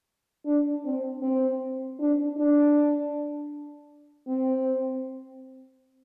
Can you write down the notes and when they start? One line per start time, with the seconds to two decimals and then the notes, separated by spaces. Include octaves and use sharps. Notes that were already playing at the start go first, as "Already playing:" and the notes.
0.46 D4
0.85 C4
1.22 C4
1.99 D4
2.37 D4
4.28 C4